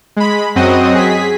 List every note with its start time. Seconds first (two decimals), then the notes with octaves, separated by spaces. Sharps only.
0.16 G#3 B5
0.55 F#2 F#3 C4 F#4 D#5 D#6
0.95 G#4 B6